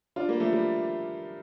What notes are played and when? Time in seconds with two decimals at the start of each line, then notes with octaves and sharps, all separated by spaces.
0.16 D4 F4
0.28 G3 A#3
0.40 F3 A3
0.53 G3